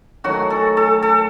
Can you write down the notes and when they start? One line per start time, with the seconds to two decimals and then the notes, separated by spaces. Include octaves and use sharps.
0.24 D#3 F#3 A3 F#4
0.50 A4
0.77 A4
1.02 A4